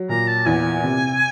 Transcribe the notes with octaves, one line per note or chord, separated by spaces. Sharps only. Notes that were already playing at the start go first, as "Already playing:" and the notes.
Already playing: F#3
A#2 A#5
A5
E2 G#5
C3